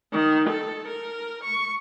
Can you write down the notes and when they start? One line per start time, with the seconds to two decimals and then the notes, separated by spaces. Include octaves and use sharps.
0.13 D#3
0.49 A4
0.88 A#4
1.43 C#6